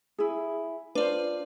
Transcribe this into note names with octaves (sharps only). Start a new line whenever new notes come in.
E4 G#4
D4 F4 B4 C5 D5